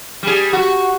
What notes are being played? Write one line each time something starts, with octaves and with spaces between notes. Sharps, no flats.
G3 G#4
F#4